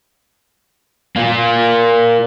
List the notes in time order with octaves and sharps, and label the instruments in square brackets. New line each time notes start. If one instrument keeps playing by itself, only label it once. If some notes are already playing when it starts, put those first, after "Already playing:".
[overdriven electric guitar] A#3 F4